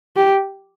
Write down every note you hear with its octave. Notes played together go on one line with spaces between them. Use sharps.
G4